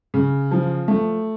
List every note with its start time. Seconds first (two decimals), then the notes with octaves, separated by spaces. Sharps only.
0.14 C#3
0.51 F3
0.88 A3